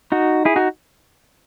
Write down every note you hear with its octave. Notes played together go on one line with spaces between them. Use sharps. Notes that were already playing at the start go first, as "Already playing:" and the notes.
D#4 F#4
E4 G#4
D#4 F#4